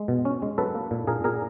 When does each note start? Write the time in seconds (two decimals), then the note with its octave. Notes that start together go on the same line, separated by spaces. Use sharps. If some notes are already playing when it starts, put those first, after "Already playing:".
Already playing: G#3
0.08 B2
0.25 C#4
0.42 G#3
0.58 F#3 A4 B4
0.75 A#3
0.91 A#2
1.07 A#2 G#4 A#4
1.24 A#2 G#4 A#4